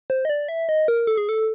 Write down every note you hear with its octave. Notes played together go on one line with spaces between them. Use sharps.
C5
D#5
D5
E5
D#5
A#4
A4
G#4
A4